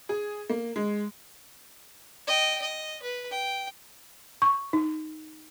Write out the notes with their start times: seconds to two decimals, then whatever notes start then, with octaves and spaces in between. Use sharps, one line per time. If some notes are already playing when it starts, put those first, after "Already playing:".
0.09 G#4
0.50 A#3
0.76 G#3
2.28 D#5 G5
2.62 D#5
3.03 B4
3.31 G5
4.42 C#6
4.73 D#4